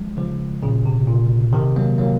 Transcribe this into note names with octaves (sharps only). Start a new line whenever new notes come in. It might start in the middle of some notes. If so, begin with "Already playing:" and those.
Already playing: F3 G#3
C#3 F3
A#2 C#3
C3
A#2
C3 D#3
F#3 A#3
F#3 A#3